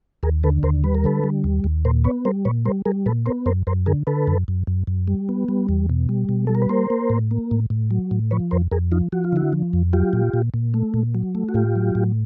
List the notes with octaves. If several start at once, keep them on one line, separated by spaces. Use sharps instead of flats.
D#2 G#4 A#4
D3 A4 B4
D#2 A#4 C5
G3 B4
A#4
D3 A4 B4
G3
D#2
D#2
A#2 A#4 C5
B3 B4 C#5
G3 A#4 C5
A#2 B4 C#5
G3 A#4 C5
G3 G#4 A#4
A#2 A4 B4
B3 A#4 C5
F#2 A#4 C5
F#2 A#4 C5
D3 G#4 A#4
D3 A4 B4
F#2
F#2
F#2
F#2
G3
B3
G3
E2
B2
G3
B2
G3 A4
A#4
B4
A#3 A#4 C5
A#3
A2
A#3
A2
A2
F#3
A2
F3 B4 C#5
F2 A#4 C5
F2 G#4 A#4
F3 D#4 F4
F3 F#4
F4
D3 E4 F#4
F3
F2
F#3 F4 G4
A#2
A#2
A#2
A3
A#2
F#3
A3
F#4
A2 F4 G4
F#3
A2